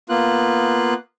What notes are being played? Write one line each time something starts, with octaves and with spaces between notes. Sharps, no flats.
A#3 B3 F4 F#6